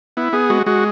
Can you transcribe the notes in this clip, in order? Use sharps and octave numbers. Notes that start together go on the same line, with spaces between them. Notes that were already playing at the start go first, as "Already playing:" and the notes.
B3 E4
B3 G#4
G#3 F#4
G#3 F#4